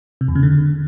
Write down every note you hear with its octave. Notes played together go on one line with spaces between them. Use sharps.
C3
E2
C#3
D3